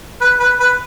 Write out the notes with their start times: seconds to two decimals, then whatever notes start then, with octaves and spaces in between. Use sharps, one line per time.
0.21 B4
0.40 B4
0.60 B4